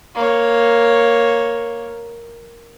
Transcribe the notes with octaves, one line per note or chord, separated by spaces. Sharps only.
A#3 C#5